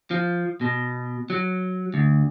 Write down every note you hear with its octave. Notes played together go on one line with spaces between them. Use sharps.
F3
B2
F#3
D2